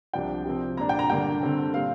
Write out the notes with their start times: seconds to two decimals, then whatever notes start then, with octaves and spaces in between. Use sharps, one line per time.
0.13 C2 C3 F3 D4 G5
0.45 C3 F3 C4
0.77 A#2 A#3 D4 A#5
0.89 G5
0.99 A#5
1.10 G2 D3 A#3 D4 G5
1.43 G2 D3 G3 C4
1.74 A#2 G3 C4 F5